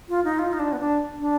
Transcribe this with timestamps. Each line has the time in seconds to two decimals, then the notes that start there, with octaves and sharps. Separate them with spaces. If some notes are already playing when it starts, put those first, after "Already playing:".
0.09 F4
0.24 D#4
0.39 F4
0.53 D#4
0.59 D4
0.72 B3
0.79 D4
1.20 D4